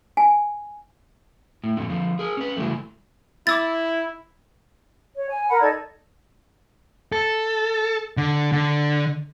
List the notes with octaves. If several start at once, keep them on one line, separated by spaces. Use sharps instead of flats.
G#5
A2
F2 A#2 D3
D3 F3
G#4 A#4
C#4 B4
C#3 E3 F#3 G3 A3
E4 D6 E6 A6
C#5
G#5
A#4 F#5 B5
D#4 A4 D5 G#6
A4
D3
D3